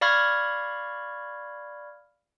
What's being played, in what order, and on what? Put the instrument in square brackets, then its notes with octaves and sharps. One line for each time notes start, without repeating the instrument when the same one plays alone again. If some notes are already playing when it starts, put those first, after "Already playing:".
[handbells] D5 F5 B5 C#6 F6 G#6